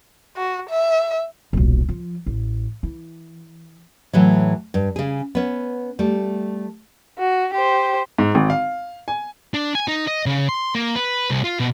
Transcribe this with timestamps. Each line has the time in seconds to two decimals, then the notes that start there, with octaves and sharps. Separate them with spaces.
0.37 F#4
0.70 E5
1.53 D#1 B1
1.89 F3
2.26 A1
2.83 E3
4.13 A2 E3 F#3
4.74 G2
4.96 C#3 G#4
5.35 B3 C#4
5.99 G3 A3
7.18 F#4
7.53 G4 C5
8.18 G#2
8.35 G#1
8.50 F5
9.08 G#5
9.54 D4
9.75 G#5
9.88 D#4
10.07 D#5
10.26 C#3
10.49 C6
10.75 A#3
10.96 B4
11.30 C2
11.44 F4
11.59 B2